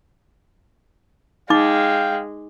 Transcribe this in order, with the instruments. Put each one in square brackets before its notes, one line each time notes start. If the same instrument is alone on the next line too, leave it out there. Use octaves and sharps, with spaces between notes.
[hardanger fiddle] G#3 [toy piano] D#4 D6 [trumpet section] F5 G5